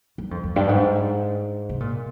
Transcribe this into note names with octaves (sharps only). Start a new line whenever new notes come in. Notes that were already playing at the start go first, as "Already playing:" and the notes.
G2
F2
F2
G2
G#2
C3
A#2